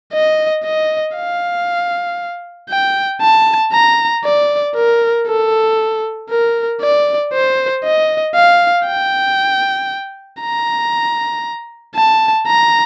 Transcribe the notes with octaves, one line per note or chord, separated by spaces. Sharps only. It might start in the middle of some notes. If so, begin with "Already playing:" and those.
D#5
D#5
F5
G5
A5
A#5
D5
A#4
A4
A#4
D5
C5
D#5
F5
G5
A#5
A5
A#5